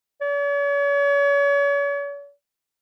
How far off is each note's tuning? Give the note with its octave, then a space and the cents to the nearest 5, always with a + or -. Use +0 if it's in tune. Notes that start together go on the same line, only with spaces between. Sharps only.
C#5 +40